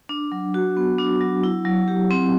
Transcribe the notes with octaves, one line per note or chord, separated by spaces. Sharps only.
D4
F#3
F#4
B3
D4
F#3
E4
F#3
G4
C4